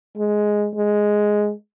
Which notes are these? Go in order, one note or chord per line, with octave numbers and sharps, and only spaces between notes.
G#3
G#3